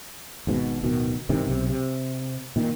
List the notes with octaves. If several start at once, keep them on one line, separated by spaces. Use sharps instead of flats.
G#1 G#2 B2
D1 B2 D#3
G#2 C3 D#3 E3
B1 C3
C3
A#2 D#3